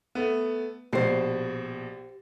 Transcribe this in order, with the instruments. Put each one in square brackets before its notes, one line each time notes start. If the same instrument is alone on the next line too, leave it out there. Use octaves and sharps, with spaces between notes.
[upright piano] A3 B3
[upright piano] A#1 B2 C7 [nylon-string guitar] G4 C5